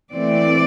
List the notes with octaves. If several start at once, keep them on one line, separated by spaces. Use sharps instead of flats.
E3 A3 C4 D5